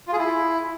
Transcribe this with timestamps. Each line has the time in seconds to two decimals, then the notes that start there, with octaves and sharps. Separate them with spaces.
0.08 F4
0.13 G#4
0.18 E4